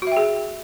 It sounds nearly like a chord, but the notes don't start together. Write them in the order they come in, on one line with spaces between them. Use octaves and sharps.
F#4 E5 G5 G#4